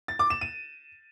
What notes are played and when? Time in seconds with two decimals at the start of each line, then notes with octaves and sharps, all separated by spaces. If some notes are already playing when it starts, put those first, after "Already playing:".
0.08 A6
0.19 D6
0.30 E7
0.41 D#7